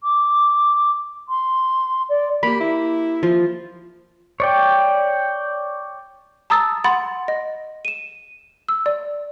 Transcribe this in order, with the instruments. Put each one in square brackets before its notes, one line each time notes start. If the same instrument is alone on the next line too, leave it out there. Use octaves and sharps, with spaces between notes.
[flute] D6
C6
D5
[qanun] A#3 G4 [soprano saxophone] B5
[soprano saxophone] E4
[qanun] F3 F4
[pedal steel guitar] C#5 D5 G5
[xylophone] A5 A#5 D#6 E6 A6
F#5 B5 C6 A6
D#5
D#7 E7
E6
D5